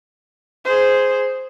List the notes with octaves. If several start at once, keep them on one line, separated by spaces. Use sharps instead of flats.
G#4 C5